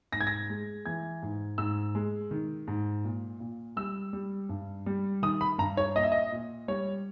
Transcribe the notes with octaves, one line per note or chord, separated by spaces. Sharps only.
G#2 A#6
G#6
A#6
G#3
E3 G#6
G#2
G#2 E6
G#3
D#3
G#2
A#2
A#2
G3 E6
G3
G2
G3
D#3 D#6
B5
G2 A#5
C#5
A#2 D#5
E5
D#5
A#2
G3 C#5